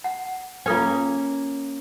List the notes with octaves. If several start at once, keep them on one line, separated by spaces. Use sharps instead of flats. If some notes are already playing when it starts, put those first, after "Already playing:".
F#5
A#3 C#4 F4 A4 G5